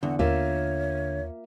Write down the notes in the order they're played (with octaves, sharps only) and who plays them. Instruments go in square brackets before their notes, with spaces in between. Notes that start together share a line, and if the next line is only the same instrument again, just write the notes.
[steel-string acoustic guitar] E2 [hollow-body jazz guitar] D3 [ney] F#5
[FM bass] D#2 [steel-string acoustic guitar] A#3 F4 E5 [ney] C#5